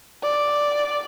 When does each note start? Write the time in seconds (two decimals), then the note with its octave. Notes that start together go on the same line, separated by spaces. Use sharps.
0.23 D5